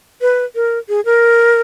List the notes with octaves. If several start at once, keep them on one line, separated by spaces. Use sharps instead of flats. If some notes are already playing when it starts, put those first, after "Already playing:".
B4
A#4
G#4
A#4